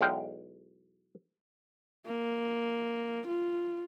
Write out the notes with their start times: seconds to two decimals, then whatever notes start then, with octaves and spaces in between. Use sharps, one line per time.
0.01 B1 E2 G#3 F5 G5
2.06 A#3
3.27 F4